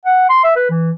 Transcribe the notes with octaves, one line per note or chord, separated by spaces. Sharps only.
F#5
C6
E5
B4
E3